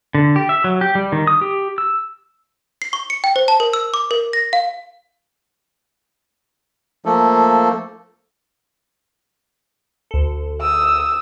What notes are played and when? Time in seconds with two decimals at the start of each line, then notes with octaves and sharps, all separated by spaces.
0.15 D3
0.36 G4
0.49 E5
0.64 F#3
0.81 G4
0.95 G3
1.12 D#3
1.27 D#6
1.41 G4
1.78 E6
2.82 C7
2.93 C#6
3.10 C#7
3.24 G5
3.36 C5
3.48 A5
3.60 A#4
3.73 E6
3.94 D6
4.11 A#4
4.33 A#6
4.53 F5
7.05 F3 A3 A#3 A4
10.11 D2 A4
10.61 D#6 E6